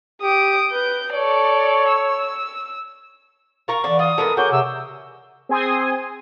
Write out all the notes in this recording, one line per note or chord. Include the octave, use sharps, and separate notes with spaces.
G4 D#6 D7
B4 G6
A4 C#5 D5
E6
F4 A#4 A#5 C#6
D3 E3 D4
F4 F#4 D#6
E3 G#3 B3 A4 A#4
F#4 G#4 C#5 D6 G6
C3 E6
C4 G#4 G#5 C6 D#6